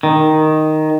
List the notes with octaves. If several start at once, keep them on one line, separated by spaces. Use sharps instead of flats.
D#3